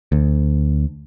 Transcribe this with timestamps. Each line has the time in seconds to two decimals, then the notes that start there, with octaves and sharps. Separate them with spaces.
0.12 D2